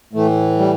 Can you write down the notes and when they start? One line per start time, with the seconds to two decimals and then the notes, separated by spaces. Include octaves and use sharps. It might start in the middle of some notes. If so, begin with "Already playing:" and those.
0.13 A2 E3 A3
0.58 G3